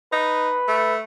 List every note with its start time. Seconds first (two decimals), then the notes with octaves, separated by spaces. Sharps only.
0.13 D#4 B4
0.68 A3